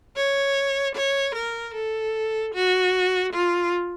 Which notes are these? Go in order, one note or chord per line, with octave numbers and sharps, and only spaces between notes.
C#5
C#5
A#4
A4
F#4
F4